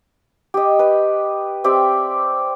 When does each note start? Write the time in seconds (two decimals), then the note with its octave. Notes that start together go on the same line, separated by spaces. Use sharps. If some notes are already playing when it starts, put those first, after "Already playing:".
0.54 G4 D#5
0.79 B4
1.64 C4 G4 D5 E5